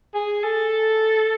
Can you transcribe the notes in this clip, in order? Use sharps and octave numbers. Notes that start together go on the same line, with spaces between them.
G#4
A4